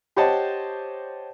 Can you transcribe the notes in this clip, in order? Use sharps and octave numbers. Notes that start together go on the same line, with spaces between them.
G4 C5 C#5 D#5 F#5 A5